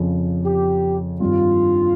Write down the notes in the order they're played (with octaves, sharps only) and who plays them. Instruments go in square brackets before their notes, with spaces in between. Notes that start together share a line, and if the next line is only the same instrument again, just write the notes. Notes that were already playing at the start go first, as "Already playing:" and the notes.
Already playing: [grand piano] F2 C#3 F3
[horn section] G4
[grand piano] G2 D#3 G3 C4 [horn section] F4